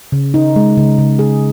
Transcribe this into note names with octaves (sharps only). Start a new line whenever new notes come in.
C#3
D#4
G#3
C#3
C#3
G#4